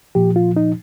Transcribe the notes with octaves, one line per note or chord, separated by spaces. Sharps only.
A#2 F3 G4
F4
D#4